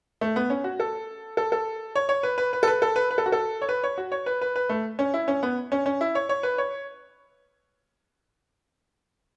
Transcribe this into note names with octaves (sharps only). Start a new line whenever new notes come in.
A3
B3
C#4
F#4
A4
A4
A4
C#5
C#5
B4
B4
B4
A4
B4
A4
B4
B4
A4
F#4
A4
C#5
B4
C#5
F#4
C#5
B4
B4
B4
A3
C#4
E4
C#4
B3
C#4
C#4
E4
C#5
C#5
B4
C#5